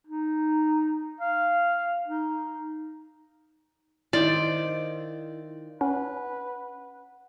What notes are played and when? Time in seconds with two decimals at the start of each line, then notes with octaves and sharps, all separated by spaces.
0.07 D#4
1.21 F5
2.07 D#4
4.13 D#3 E4 F4 C5 D5
5.81 C#4 B4 F#5